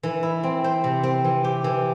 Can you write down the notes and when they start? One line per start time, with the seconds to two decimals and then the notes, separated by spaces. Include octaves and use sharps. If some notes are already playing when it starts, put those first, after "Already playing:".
0.03 E3
0.23 E4
0.43 C4
0.64 C5
0.84 C3
1.03 C4
1.24 E3
1.44 G4
1.64 E3